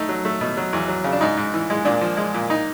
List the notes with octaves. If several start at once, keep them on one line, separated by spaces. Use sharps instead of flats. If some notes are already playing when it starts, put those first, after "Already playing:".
Already playing: A3 D#4
F#3
A3
B2
F#3
E2
F#3
C#3
D4
G#2 D#4
G#2
E3
G#3
A#2 D4
F3
G#3
A#2
D#4